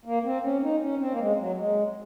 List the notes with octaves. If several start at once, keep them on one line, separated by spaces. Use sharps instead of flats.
A#3
C4
C#4
D#4
C#4
C4
A#3
G#3
F#3
G#3